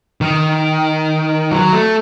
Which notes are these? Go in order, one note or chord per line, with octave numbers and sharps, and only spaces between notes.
D#3
F#3
A3